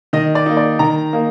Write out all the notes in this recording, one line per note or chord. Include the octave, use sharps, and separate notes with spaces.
D#3 D#5
D5
A#3 D#4
D5
D#3 A#5
A#3 D#4